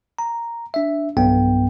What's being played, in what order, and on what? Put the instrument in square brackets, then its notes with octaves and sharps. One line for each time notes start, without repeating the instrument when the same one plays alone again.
[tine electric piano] A#5
D4 E5
B1 G2 B3 G5